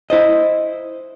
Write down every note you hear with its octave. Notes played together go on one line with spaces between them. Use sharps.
E4 C5 D#5